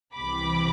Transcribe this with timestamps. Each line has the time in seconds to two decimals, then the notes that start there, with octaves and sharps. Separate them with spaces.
0.14 C2 C3 E3 B5 D6